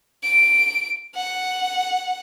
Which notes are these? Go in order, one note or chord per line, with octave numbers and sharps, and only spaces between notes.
D7
F#5